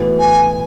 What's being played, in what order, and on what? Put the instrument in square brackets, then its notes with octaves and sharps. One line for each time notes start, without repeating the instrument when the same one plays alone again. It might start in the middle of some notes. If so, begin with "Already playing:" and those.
Already playing: [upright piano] A2 E3 B3 F#4
[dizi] G#5